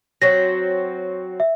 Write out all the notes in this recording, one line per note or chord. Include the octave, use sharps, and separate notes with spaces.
F#3 C4 F#4 C#5 A#6
E5